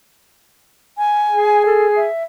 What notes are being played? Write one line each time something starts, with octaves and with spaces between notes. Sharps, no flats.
G#5
G#4
A4
E5